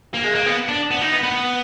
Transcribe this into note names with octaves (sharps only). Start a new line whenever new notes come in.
A#3
G#3
A#3
B3
D4
B3
D#4
B3
B3